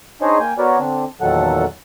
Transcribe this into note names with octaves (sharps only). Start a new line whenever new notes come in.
D4 D#4 G#4 C5 C#5 D#5
A#3 G5 G#5
B3 F#4 A#4 B4 C#5 D5
D3 C4 D4
E2 A#2 D#3 F#3 A4 F#5